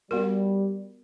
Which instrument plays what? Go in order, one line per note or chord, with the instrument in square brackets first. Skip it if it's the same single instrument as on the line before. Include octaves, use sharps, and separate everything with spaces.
[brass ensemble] G3 [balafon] B3 F#4 A#4